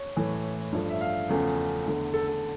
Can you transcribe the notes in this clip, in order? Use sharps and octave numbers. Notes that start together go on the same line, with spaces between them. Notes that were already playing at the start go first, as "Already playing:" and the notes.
Already playing: C#5
A2 E3 A3
G2 F3 A3
E5
F5
E2 C#3 F3 A3
E2 D3 A3
A4
A4